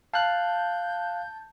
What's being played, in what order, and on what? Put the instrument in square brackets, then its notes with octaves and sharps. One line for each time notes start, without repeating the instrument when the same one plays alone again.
[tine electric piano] F5 F#6 [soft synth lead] A5 [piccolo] G6